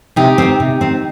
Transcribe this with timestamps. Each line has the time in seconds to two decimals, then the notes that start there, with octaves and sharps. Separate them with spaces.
0.16 C3 D#4 G4
0.38 D#3 C4
0.60 C3
0.81 D#3 C4